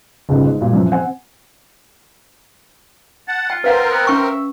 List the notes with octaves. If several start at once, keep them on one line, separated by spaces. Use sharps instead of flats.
G1 C#2 G#2 C#3
G#2
G2 A#2
F#2 E3 F3
C4 F#5 G#5
F#5 A5
F4 G5
C4 A#4 B4 F5 F#5
B3
C#4 E5 G5 C#6